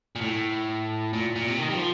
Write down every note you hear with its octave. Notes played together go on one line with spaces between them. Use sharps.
A#2
A2
A#2
A#2
C3
D#3
G3
F3